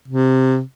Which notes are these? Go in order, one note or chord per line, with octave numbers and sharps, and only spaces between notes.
C3